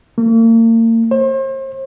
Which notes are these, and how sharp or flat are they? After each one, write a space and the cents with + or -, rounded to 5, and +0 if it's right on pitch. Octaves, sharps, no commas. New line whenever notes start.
A#3 -40
C5 +40